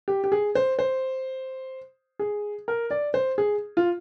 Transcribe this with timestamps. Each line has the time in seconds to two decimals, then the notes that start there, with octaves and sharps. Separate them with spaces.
0.08 G4
0.24 G4
0.32 G#4
0.55 C5
0.79 C5
2.19 G#4
2.68 A#4
2.91 D5
3.14 C5
3.38 G#4
3.77 F4